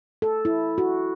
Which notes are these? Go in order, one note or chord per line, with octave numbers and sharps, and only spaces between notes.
A4
E4
F#4